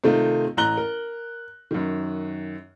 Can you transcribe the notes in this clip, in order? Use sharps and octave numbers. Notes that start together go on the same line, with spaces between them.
C3 D#3 A3 C4 D#4 F4
A1 A#5 F#6 G7
A#4
F#2 D#3